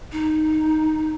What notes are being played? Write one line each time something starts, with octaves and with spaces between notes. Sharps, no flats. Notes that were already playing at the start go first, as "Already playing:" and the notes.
D#4